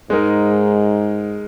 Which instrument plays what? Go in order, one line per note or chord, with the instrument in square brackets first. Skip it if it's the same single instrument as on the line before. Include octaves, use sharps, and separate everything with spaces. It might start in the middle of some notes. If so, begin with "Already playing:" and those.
[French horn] G#2 [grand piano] G#3 D#4 A#4